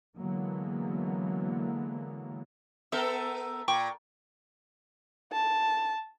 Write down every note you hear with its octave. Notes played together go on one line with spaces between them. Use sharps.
D3 E3 F#3 G#3 A#3 B3
B3 A4 A#4 E5
A#2 G5 C#6 D6
A5